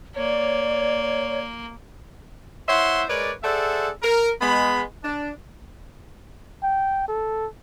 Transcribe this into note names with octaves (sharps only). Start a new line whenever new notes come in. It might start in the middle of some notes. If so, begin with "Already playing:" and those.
A#3 C#5 D5
E4 C5 C#5 E5 F#5 C6
G#3 A#4 B4 C#5 D5
G#4 A4 C5 D5 E5 F#5
A#4
G#3 B3 B5
D4
G5
A4